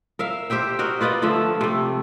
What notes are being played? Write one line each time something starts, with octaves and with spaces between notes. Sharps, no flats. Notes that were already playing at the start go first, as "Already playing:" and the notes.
A#4 E5 F5
G4 C5 E5 G5
F#4 A#4 D#5
F4 B4 D5 D#5
D3 F3 A3 E5
C3 A3